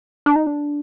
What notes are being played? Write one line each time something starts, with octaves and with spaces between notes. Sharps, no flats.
D4
D#4
D4